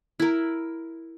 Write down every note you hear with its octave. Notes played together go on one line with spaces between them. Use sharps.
E4 A#4